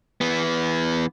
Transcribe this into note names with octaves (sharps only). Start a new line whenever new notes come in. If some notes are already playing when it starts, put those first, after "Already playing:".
E3 B3